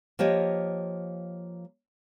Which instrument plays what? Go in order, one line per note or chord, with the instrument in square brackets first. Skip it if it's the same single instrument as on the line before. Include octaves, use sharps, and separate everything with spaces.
[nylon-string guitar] F3 A#3 G4 C#5 D#5